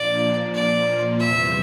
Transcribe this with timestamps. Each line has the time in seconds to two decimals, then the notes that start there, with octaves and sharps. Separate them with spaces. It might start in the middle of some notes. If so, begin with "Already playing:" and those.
Already playing: A#2 F3 A#3 D4 D5
0.55 A#2 F3 A#3 F4 D5
1.20 E2 C3 E3 G3 E5